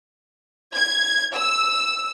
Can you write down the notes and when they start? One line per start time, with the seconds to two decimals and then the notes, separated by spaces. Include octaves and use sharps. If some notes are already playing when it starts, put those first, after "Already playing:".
0.75 G#6
1.36 E6